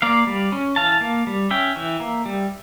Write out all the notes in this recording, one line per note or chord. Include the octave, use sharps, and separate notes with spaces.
A#3 D5 F5
G3
C#4
E3 F5 A5
A#3
G3
C#4 E5 G5
E3
A#3
G3